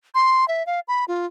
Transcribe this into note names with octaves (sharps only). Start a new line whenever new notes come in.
C6
E5
F5
B5
F4